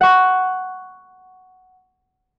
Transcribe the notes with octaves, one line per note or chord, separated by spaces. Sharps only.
F#5 C#6